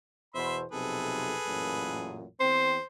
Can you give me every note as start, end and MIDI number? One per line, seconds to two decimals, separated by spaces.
0.35 0.65 40
0.35 0.65 47
0.35 0.65 72
0.35 0.57 76
0.35 0.57 83
0.35 0.57 84
0.72 1.34 35
0.72 1.34 41
0.72 1.34 48
0.72 2.23 68
0.72 2.23 69
0.72 2.23 71
1.46 2.26 33
1.46 2.26 42
1.46 2.26 46
2.40 2.76 40
2.40 2.76 60
2.40 2.85 72